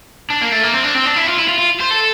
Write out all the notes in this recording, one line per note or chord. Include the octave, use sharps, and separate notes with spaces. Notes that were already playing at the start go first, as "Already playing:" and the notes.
D4
A#3
A3
A#3
C4
D4
C4
D4
E4
F4
E4
F4
F4
C5
A4